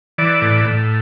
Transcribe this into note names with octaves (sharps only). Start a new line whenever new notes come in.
E3 D5
A2
A2